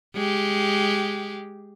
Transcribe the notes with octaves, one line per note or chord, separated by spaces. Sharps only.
G#3 G4